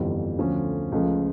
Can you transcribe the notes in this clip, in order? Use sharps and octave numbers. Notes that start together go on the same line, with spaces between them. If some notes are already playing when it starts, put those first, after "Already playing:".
Already playing: G1 F2 E3 G3 D4
D2 D3 F3 A3 C#4
C#2 C#3 F3 A3